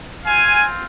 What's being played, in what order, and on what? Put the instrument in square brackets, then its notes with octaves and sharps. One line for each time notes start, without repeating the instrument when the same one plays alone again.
[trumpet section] C4 F4 F5 G#5